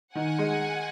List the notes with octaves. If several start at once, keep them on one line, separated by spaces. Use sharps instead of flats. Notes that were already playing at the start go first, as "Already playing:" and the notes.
D#3 F#5 G#5
G#3